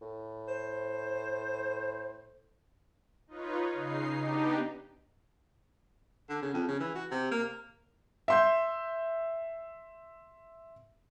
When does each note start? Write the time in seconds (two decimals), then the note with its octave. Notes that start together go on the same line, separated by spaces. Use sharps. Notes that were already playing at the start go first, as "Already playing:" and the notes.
0.02 A2
0.48 C5
3.27 D#4 F4 B4 C#5
3.74 C#3 D#4 C7
4.20 B3 D4 D#4 G4
6.29 D3
6.42 C#3
6.54 F2
6.68 C#3
6.80 E3
6.95 F#4
7.11 C3
7.31 A#3
8.28 E5 C6 G6